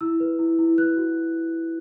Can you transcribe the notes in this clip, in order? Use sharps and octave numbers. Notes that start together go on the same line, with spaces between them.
E4 E6
B4
E4
E4
B4 F#6
F#4